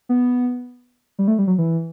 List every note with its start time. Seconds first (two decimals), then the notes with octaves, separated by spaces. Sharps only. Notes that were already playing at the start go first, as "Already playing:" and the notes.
0.09 B3
1.19 G3
1.28 A3
1.38 G3
1.47 F#3
1.58 E3